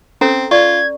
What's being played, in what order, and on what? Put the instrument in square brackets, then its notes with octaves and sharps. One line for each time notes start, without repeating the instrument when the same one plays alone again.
[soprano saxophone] C4 [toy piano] C#4 A4 A#5
[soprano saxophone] F4 [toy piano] D5 C#6 [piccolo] G#6